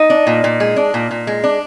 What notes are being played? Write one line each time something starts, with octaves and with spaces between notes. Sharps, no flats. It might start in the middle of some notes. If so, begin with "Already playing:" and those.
Already playing: D#4
D4
A#2
A#2
G#3
D4
A#2
A#2
G#3
D4